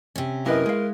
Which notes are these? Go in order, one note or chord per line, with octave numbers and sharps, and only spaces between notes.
C3 C#4
F#2 A#3 E4 A#4 B4 D#5
G#3 F5